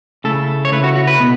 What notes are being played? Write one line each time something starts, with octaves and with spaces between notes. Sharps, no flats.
C#3 A3 E4 A4
C#5
C#3 A3 E4 B4
F#4
F#4
B4
B2 B3